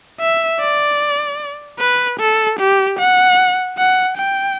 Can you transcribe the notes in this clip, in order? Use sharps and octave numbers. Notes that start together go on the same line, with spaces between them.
E5
D5
B4
A4
G4
F#5
F#5
G5